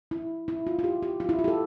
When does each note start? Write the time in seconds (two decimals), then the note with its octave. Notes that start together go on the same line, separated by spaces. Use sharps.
0.11 E4
0.48 E4
0.67 F4
0.79 F4
0.84 G4
1.03 G4
1.20 F4
1.29 E4
1.39 F4
1.44 G4
1.48 A4